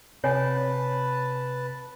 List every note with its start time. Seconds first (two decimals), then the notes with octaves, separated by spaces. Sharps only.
0.24 C3 B4 C#5 F#5 G#5 A5